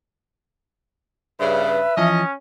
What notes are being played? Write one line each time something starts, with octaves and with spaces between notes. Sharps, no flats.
G2 C#3 B4 E5
E3 F3 C#4 D#5